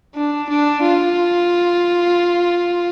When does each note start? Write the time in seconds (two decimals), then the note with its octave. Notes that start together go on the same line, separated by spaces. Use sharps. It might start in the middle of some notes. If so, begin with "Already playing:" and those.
0.15 D4
0.49 D4
0.82 F4